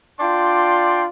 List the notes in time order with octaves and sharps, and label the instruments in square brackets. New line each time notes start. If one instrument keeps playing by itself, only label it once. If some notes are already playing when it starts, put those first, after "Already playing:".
[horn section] D4 F4 D5 G5 C6